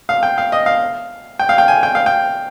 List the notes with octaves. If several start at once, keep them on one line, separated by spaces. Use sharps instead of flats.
F5
G5
F5
D#5
F5
G5
F5
G5
G#5
G5
F5
G5